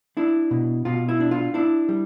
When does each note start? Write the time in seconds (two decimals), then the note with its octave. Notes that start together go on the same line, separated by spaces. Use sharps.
0.17 D4 E4
0.51 B2
0.85 B2 F4
1.08 E4
1.20 D4
1.31 F4
1.54 D4 E4
1.89 G3